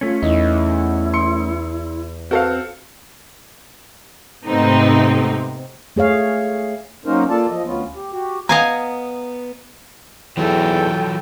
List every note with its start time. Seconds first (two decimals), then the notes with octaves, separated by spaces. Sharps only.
0.01 A3 C#4 F4
0.23 E2 D#4 E4
1.13 C6 C#7
2.31 C4 F#4 A4 B4 F5
4.46 G#2 C3 A3 B3 C4 D#4
5.96 A3 G#4 C#5 F5
7.06 F#3 A#3 C#4 D#4 A#4 C5
7.30 A#3 F4 A4 D5 A5
7.50 F3 D#5
7.65 D2 B3 C#4 F4
7.96 G4
8.12 F#4 G4
8.49 B3 D#5 F5 G#5 A#5
10.37 E2 E3 F#3 A4 G5